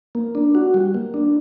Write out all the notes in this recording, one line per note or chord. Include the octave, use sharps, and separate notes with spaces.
A#3
D4
F#4
G3
A#3
D4